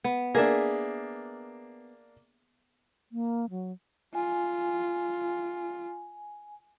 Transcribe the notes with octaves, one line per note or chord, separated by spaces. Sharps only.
B3
A#3 D4 G#4 E5
A#3
F#3
F4 G#5